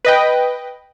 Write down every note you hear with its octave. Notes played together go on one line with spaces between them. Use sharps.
B4 D#5 G5